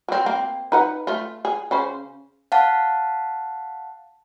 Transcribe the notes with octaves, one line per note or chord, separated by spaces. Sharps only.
F#3 C4
A#3 C4
D#4 B4 F#5
A3 F4
G#4
C#3 C#4 C5
F5 F#5 A5